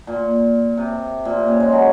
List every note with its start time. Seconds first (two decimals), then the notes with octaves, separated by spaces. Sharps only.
0.07 A#2
0.77 C3
1.25 A#2
1.37 C3
1.48 C#3
1.60 G#3
1.72 F#3